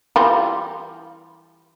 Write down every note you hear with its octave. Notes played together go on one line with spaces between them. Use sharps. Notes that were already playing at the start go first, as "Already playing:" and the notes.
E3 G3 F4